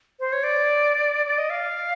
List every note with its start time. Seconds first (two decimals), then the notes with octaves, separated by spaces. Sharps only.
0.20 C5
0.33 C#5
0.43 D5
1.26 D5
1.38 D#5
1.50 F5